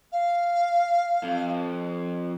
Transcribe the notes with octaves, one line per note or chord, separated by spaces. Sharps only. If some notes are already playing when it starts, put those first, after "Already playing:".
F5
F2